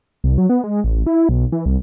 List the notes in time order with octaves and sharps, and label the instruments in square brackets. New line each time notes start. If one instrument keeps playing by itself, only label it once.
[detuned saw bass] C2
F#3
B3
G#3
A1
E4
B1
E3
C2